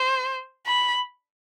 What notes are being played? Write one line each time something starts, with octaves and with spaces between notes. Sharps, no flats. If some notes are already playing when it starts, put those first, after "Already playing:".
Already playing: C5
B5